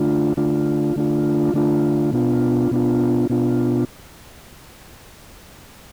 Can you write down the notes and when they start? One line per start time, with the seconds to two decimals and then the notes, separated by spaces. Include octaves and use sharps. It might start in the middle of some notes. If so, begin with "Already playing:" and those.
Already playing: D3 A3 D4 F4
0.37 D3 A3 D4 F4
0.96 D3 A3 D4 F4
1.54 D3 A3 D4 F4
2.13 B2 B3 D4 F4
2.71 B2 B3 D4 F4
3.30 B2 B3 D4 F4